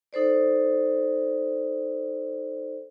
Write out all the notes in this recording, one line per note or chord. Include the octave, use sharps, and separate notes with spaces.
D#4 A4 C5 D5